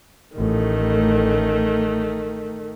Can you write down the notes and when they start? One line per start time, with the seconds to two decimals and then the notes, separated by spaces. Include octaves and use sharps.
0.36 A1 D#3 A3